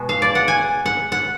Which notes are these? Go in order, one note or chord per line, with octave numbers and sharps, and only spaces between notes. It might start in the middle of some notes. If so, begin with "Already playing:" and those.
Already playing: B2 G#3 B3
F5
D5
F#5
G#5
F#5
F#5